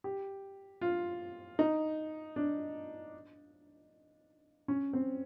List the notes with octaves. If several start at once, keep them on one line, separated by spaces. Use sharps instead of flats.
G4
F4
D#4
D4
C#4
C4